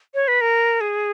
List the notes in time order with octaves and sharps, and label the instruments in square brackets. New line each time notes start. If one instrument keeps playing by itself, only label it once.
[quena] C#5
B4
A#4
G#4